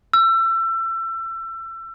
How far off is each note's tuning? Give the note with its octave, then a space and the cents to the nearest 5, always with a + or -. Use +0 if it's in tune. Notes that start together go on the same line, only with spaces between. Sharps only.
E6 +30